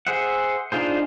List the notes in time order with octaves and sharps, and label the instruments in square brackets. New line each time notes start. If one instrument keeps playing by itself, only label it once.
[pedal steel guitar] G#4 C5 E5 F#5
D4 D#4 F4 G#4 C5